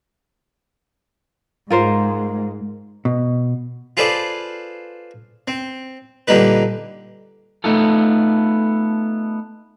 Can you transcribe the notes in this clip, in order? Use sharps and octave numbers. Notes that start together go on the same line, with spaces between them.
G#2 G#3 F4 A#4 C5
B2
F4 G#4 A4 B4 C5 D5
C4
A#2 D3 G3 D#4 B4
A3 B3 D#4 F4 A4